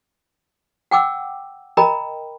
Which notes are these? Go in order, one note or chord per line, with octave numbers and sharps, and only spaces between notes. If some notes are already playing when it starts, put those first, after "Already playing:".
F#5 G5 D6 E6
A#4 D#5 G5 A#5 B5